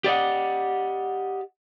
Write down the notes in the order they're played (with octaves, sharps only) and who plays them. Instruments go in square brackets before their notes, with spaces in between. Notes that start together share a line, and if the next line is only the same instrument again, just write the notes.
[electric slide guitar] G4 D5 D#5 F#5